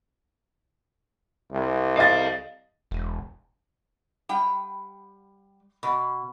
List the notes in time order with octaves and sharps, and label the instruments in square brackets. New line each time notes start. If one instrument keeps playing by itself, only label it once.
[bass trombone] C2
[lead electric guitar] A4 F5 [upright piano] D#5 A6
[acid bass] E1
[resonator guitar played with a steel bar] G3 G5
B2